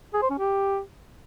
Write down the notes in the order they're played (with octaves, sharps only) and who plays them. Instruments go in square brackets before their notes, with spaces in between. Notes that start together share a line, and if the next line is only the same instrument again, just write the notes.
[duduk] G#4
C5
C#4
G4